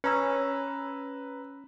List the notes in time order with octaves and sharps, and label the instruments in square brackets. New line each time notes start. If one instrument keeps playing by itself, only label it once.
[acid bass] C#4 [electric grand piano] B4 A#5 E6